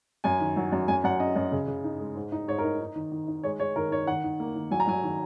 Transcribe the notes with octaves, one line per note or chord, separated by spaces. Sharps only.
F#2 G#5
D#3
F#3
F#2
F#2 G#5
F#2 F#5
C#4 D#5
F#2
C#3
C#3
D#4
G#3
G#2
D#4
G#2 C#5
A#4
D#4
D#4
D#3
D#3
D#4
G#3 C#5
G#3 C#5
D#3 A#4
D#3 C#5
D#3 F#5
D#3
A#3
D#3
F#3 G#5
A#5
F#3 G#5
D#3